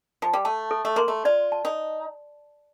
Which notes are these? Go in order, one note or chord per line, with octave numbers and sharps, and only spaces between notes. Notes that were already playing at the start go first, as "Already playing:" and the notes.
F3
G3
A3 A5
A4
A3
A#3 C6
A3
F4 D5
A5
D#4